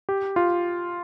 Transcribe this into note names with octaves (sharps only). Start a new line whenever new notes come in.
G4
F4